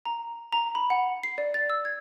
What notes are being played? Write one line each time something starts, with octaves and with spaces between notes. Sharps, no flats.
A#5
A#5
B5
F#5
C7
D5
A6
E6
G#6